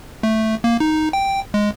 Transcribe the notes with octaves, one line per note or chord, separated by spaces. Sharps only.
A3
A#3
D#4
G5
G#3